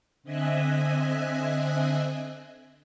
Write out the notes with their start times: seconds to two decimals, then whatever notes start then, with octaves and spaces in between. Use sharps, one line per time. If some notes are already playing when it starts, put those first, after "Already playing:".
0.23 D3 C4 D#5 E5 G#5 F#6